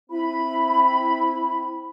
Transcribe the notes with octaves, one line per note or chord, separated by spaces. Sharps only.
C4 E4 B5